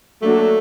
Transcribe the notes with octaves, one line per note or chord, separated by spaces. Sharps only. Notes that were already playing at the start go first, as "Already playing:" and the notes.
F#3 A3 A#3 D4 F#4 A4